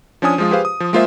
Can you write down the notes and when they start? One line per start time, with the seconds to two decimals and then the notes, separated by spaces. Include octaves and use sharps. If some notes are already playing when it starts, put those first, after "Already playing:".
0.22 F3 C#4 D4 G#5 D#6
0.38 F3 G#3 F4
0.51 G4 G#4 B4 C5 F5
0.65 D#6
0.80 F3
0.93 G#3 A#3 F4 G#4 C5 E5